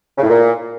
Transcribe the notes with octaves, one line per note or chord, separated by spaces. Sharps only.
C#3
A2
A#2